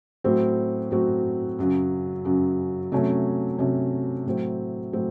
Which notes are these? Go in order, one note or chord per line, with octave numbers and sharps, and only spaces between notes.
A2 F#3 C4 F#4
A2 F#3 C4 F#4
F#2 C#3 F#3
F#2 C#3 F#3
C3 F#3 A3 C#4
C3 F#3 A3 C#4
A2 F#3 C4
A2 F#3 C4